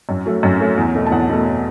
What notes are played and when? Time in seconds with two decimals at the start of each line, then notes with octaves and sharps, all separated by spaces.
0.09 F#2
0.26 F#3 A3
0.43 F#2
0.60 F#3 A3
0.78 E2
0.95 B2 A3
1.07 A5
1.12 E2 F#5
1.29 B2 A3